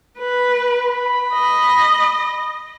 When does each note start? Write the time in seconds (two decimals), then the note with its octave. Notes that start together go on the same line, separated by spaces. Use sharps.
0.18 B4
0.87 B5
1.33 D#5